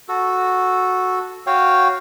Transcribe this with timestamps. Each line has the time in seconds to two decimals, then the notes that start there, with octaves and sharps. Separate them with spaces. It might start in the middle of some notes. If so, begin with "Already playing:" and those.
0.09 F#4 A4
1.47 F#4 C#5 F5 G5